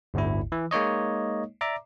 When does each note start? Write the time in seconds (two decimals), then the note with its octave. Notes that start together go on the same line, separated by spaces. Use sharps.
0.14 G1 D2 A2 E4
0.52 E3
0.71 G#3 A#3 D#4 C#5 D#5
1.61 D5 E5 A#5 D6